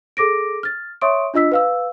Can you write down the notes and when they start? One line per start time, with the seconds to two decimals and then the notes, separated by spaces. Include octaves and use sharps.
0.17 G#4 A4 D6 A#6 D7
0.63 F6 A6
1.01 C#5 E5 C6 C#6 D#6 D7
1.34 D4 F4 D#5 E6 B6
1.52 B4 F5 E6